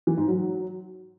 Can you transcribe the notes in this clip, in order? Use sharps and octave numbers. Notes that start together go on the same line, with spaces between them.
E3
G#2
F#3